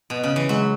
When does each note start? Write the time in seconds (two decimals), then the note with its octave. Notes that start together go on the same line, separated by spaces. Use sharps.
0.10 B2
0.24 C#3
0.36 E3
0.49 F#3 G#3